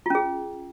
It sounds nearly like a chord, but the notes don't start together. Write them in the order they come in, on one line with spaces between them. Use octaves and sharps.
F4 C#4 G#4